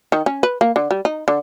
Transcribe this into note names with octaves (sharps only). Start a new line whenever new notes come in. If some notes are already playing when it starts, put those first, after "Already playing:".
D#3
C#4
B4
A#3
D3
G3
D#4
D3